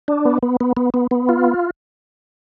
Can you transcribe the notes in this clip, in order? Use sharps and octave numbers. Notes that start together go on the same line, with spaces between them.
D4
B3
B3
B3
B3
B3
B3
F4